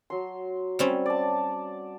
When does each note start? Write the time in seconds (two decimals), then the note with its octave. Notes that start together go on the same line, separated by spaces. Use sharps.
0.10 F#3 C6
0.79 G3 C4 C#4
1.06 D5 A5